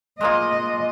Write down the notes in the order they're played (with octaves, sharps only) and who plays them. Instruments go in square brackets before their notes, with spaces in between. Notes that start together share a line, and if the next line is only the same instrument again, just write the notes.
[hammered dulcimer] G#3 A#3 F4 [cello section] D#5